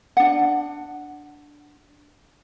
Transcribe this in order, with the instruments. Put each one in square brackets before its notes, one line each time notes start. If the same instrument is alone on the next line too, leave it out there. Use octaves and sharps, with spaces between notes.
[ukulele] D4 F#5